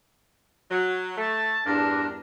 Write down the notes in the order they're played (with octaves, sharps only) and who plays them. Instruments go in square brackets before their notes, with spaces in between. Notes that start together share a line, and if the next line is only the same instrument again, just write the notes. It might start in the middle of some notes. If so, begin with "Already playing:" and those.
[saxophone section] F#3
[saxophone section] A3 [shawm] A5
[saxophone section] E2 G2 [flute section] D4 A5 [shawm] A#4